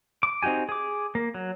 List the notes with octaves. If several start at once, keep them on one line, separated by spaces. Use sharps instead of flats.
D6
C4 D#4 F#4 G4 G#5
G#4 D6
A#3
F#3